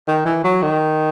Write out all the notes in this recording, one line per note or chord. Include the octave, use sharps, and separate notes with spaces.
D#3
E3
F#3
D#3